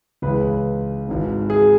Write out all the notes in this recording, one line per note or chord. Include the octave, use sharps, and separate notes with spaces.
C#2 C#3 E3 B4
G#1 G#2 E3
G#4